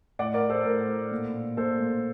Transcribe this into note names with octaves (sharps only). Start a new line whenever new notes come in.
A2 D5 F#5
A#4 D5
A2
A4 C5
A2 A#4
A2
A#2
A#2
A#2 A4 C5
A#2